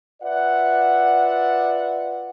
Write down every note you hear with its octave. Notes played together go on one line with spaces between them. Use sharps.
F4 B4 D5 E5 F#5